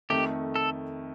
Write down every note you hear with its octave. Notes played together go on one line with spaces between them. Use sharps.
F2 D#3 A3 G4
A4